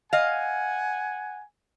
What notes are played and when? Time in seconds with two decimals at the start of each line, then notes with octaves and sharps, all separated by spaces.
0.13 D#5 F5 F#5 G#5